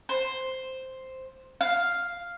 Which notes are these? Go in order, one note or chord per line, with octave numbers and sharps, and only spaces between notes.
C5
F5